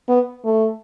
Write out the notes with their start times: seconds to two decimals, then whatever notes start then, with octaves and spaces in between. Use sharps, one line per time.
0.09 B3
0.45 A3